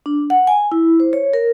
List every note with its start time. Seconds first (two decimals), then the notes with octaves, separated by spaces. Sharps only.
0.06 D4
0.30 F#5
0.47 G#5
0.72 E4
1.00 C5
1.13 C#5
1.33 A#4